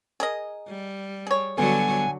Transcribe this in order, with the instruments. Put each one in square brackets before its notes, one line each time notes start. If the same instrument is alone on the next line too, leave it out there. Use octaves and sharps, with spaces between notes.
[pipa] G#4 A#4 D#5
[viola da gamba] G3
[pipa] G#4 C#5
[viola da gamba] D3 F#3 F#4 [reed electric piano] G3 B3 A4 [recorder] G#5